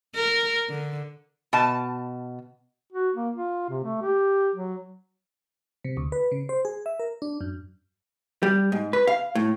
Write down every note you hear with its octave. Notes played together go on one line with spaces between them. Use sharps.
A#4
D3
B2 A5
F#4
A#3
F4
C3
A3
G4
F#3
C3
D2
B4
C#3
C5
G#4
E5
A#4
D4
F#2
G3
G#2
B4
F5
A2